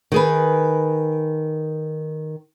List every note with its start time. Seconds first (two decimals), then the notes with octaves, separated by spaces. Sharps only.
0.12 D#3 G#4 B4